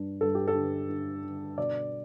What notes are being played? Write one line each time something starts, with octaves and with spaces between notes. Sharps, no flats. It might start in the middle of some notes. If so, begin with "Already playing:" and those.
Already playing: G2 D4
G2 A4
G4
A4
D3
D3
D3
B2 D5